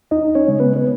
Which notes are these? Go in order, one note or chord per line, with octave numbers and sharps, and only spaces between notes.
D#2 D#4 D#5
C#4 C#5
C#3 G#3
B3 B4
B4